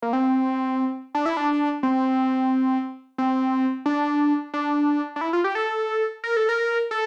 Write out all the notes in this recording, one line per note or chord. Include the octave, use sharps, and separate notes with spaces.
A#3
C4
D4
E4
D4
C4
C4
D4
D4
D4
E4
F4
G4
A4
A#4
A4
A#4
A4